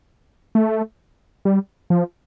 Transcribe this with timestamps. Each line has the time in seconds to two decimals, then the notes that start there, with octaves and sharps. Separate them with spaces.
0.55 A3
1.45 G3
1.90 F3